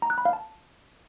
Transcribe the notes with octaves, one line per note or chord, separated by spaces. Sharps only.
A#5
F#6
B5
F5
A5